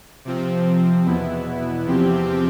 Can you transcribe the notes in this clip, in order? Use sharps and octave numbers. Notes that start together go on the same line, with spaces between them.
C3 F3 C4
E2 B2 B3 E4
E2 C3 F3 C4 G4